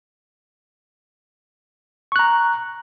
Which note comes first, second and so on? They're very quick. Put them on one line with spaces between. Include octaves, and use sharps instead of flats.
C#6 F#6 A#5